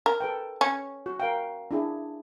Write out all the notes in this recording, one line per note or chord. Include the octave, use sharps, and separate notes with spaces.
A#4
A4 B4 G5
C#4
F#4
A#4 F5 G5
D4 E4 G#4